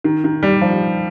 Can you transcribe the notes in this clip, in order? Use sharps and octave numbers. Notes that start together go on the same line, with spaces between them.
D#3
D#3
G3
F3